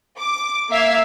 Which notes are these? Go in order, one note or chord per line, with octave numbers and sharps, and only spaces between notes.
D6
A#3 E5 F5 E6 G#6